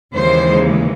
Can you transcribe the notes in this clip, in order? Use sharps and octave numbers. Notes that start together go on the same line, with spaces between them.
D#2 C#3 E3 G#3 C5